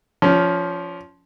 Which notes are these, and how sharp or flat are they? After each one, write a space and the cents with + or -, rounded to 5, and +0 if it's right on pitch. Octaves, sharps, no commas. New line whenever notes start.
F3 +0 C#4 +25